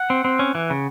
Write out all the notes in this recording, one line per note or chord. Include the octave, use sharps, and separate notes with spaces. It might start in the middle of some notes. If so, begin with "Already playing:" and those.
Already playing: F#5
C4
C4
C#4
E3
C#3